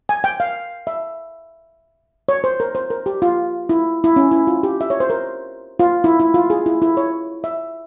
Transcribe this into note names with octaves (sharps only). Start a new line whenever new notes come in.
G#5
G5
F5
E5
C#5
C5
A#4
C5
A#4
G4
F4
E4
E4
C#4
E4
F4
G4
E5
C#5
C5
A#4
F4
E4
E4
F4
G#4
E4
E4
C#5
E5